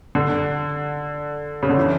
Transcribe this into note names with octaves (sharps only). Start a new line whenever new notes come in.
D3
C#3
D3
E3